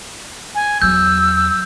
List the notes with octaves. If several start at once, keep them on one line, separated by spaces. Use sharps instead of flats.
G#5
E2 F#3 E6 G6